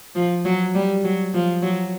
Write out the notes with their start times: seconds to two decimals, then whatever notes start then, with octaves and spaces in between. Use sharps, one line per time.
0.15 F3
0.45 F#3
0.75 G3
1.04 F#3
1.34 F3
1.62 F#3